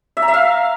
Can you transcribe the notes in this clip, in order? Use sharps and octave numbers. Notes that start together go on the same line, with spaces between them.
E5
A#5
E5
F5